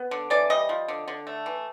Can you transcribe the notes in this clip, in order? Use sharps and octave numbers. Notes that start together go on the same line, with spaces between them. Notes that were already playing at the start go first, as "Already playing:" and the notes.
Already playing: B3
D3
E3 D5
G3 D#5
F3
D3
D3
A3
E3